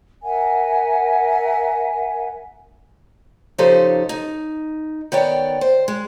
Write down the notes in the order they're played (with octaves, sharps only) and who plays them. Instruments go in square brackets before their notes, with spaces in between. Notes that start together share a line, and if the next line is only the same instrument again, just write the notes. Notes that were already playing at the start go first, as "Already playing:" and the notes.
[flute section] A#4 E5 F#5 G#5
[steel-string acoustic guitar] C#3 F3 D#4 G4 A4 C5
D#4
D#3 B3 C#5 D5 G5
C5
G#3